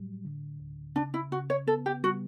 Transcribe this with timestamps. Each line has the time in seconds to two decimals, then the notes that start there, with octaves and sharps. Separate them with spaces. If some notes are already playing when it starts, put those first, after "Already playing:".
Already playing: A2 F#3 G3
0.25 D3
0.60 D2
0.96 C#3 D4
1.14 E4
1.31 C#3 F#4
1.50 C#5
1.67 B3 A4
1.86 G4
2.03 G3 F#4